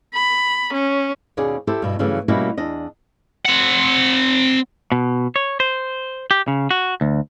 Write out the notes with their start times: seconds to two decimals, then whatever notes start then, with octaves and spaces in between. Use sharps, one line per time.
0.14 B5
0.74 C#4
1.37 D#2 B2 C#4 G#4 D5
1.67 E4 G4 A4 C5
1.82 G2 B2 E5
1.99 G2 C#3 E3 F#3 A3
2.28 B2 G3 A#3 C#4 E4 F#4
2.57 E2 D4 D#5
3.45 C4 F#5
4.92 B2
5.36 C#5
5.60 C5
6.31 G4
6.48 C#3
6.71 F#4
7.01 D2